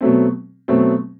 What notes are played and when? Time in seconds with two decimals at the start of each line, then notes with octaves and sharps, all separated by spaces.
0.01 B2 F#3 A3 C4
0.68 B2 F#3 A3 C4